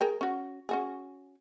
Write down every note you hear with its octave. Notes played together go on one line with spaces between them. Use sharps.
G#4 A#4 G5
C#4 F#4
C#4 F#4 G#4